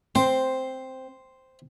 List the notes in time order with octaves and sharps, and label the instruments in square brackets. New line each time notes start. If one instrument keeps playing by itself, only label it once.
[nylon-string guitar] C4 [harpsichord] C5